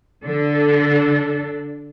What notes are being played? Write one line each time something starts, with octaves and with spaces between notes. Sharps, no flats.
D3 D4 A4